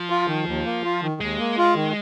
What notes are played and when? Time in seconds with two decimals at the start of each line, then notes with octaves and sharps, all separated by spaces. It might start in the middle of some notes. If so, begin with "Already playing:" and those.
Already playing: F3
0.10 F4
0.28 D#3
0.47 D#2
0.65 A#3
0.84 F4
1.02 D#3
1.20 D#2 G#3
1.39 A#3
1.58 F4
1.75 D#3